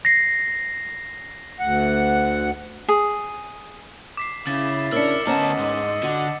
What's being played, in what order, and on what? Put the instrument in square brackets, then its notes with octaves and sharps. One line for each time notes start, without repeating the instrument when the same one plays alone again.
[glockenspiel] A#6 C7
[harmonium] D2 F#5
[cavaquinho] G#4
[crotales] D6 B6 C7
[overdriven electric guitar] C#3 [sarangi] E4 [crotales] A6
[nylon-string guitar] C#3 D4 [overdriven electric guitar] A#4 [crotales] E6 C#7
[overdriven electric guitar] D2 A5 [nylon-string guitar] B3 C#4 A#4 [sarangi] D#5
[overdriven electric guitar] G#2
[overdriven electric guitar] D3 [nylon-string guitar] F#4